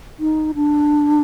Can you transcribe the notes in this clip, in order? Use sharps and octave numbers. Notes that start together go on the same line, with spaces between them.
D#4
D4